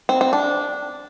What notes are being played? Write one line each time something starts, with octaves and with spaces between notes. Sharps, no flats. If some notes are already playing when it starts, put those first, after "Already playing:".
C4
C4
D4